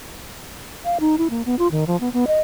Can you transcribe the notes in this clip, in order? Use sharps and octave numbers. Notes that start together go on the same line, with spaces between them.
F5
D#4
E4
A#3
B3
F4
D#3
F3
B3
B3
D#5